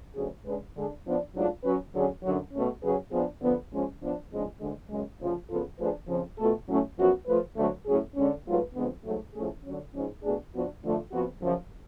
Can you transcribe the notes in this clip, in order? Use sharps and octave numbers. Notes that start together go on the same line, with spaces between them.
D2 D3 F#3 C#4 G#4
C#3 G#3 D4 G#4 B4
D3 G#3 D4 G#4
F3 B3 D4
G#2 F#3 A3 D4 F4
F#3 C#4 F#4 B4
D3 F#3 C#4 G#4
F#2 D3 F#3
B2 A3 C#4
C#3 F#3 C#4 G#4 B4
F3 B3 D4 G#4
D3 F3 B3
F3 G#3 C#4
F3 B3 D4
F2 C#3 F3 G#3 D4
D2 D3 G#3
F#2 C#3 G#3
D2 C#3 F3
C#3 F3 B3 F4 A4
F3 A3 D4 G#4 B4
F2 C#3 F3
B2 A3 F4 A4
A2 F#3 A3 C#4
F#2 F3 B3 F#4
F3 A3 F4 B4
D2 D3 F#3 A3
A2 F#3 C#4 G#4
D3 G#3 C#4
G#2 F#3 A3 F4 B4
F2 D3 G#3 B3
G#2 F#3 A3
A2 F3 A3 C#4 G#4
D3 F#3 C#4
G#2 F3 G#3 C#4
B2 A3 D4 G#4
F3 B3 D4 F#4
D3 F3 A3 F4
F2 F3 B3 F#4
F#2 C#3 F3